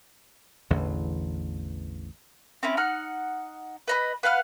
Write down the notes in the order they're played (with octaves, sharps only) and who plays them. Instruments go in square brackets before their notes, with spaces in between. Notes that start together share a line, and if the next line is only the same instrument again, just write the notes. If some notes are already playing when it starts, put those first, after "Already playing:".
[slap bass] A1 E2 D3 E3
[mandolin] C4 C#4 E4
D#4 F#5 F6
B4 D#5 B5
B4 F5 F#5 F6